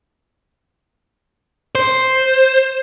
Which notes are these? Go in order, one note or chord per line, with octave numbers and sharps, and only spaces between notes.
C5